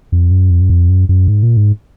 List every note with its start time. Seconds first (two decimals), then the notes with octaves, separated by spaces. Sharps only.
0.12 F2
0.31 F#2
0.51 F2
0.61 F#2
0.70 F2
0.89 F#2
1.09 F#2
1.28 G#2
1.43 A#2
1.57 G#2